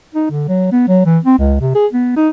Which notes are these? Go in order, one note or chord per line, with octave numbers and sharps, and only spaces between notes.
D#4
D3
F#3
B3
F#3
E3
C4
C#2
C3
G#4
B3
D#4